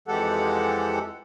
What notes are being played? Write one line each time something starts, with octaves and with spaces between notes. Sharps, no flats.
F2 E3 G#3 G4 A4 F#5